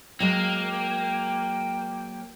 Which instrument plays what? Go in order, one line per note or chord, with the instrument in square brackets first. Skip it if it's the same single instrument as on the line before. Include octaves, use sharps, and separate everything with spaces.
[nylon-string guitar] F#3 G#3 [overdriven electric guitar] A#3 [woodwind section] G5